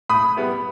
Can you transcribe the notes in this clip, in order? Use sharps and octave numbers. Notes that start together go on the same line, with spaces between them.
A2 B5 D#6
G3 B3 E4